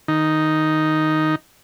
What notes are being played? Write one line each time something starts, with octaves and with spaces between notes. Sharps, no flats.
D#3 D#4